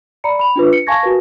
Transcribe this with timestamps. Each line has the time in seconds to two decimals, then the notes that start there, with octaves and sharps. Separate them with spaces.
0.24 D5 A#5 B5 C#7
0.39 B5 F7
0.56 D4 F4 B4
0.73 C#7
0.87 F5 G#5 A5 C#6 G#6 A#6
1.03 F#4 A#4 B4